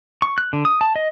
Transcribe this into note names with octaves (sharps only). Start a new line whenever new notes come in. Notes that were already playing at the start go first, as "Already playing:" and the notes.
C#6
F#6
D3
D#6
A5
D#5